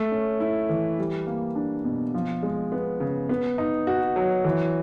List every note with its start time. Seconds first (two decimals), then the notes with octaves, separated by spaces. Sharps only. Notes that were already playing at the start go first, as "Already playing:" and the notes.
Already playing: A3
0.11 C#4
0.40 E4
0.69 E3
0.99 G3
1.27 A#3
1.55 D4
1.84 B2
2.14 F3
2.43 G#3
2.72 B3
3.00 C#3
3.29 B3
3.58 D#4
3.87 F#4
4.16 F#3
4.44 E3